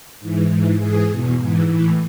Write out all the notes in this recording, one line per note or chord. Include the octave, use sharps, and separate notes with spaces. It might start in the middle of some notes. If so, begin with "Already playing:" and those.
G#2 E3
G#2 E3
G#2 E3 G#4
E2 B2
G#2 E3
A2 E3